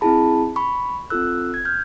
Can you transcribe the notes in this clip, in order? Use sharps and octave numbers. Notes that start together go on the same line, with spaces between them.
C4 E4 G#4 A5 B5
B5 C#6
C4 F4 A4 E6 F#6
G#6
F6 G6